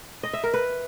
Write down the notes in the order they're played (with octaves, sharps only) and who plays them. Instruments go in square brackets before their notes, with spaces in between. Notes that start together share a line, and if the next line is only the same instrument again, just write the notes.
[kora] D#5
E5
A#4
B4